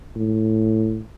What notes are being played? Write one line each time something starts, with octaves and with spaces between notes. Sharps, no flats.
A2